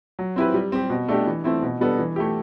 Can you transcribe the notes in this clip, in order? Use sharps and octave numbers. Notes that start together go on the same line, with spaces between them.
F#3
C4 E4 G4 B4
G3
C4 G4
B2
A3 D4 G4
E3
A3 C4 E4
B2
G3 B3 D4 A4
E3
A3 E4 G4